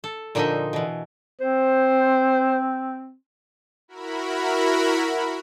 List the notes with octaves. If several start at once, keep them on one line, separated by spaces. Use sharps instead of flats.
A4
A#2 D3 F3 D#4 D#5 E5
B2 E3
C4 C5
E4 F#4 A#4 B5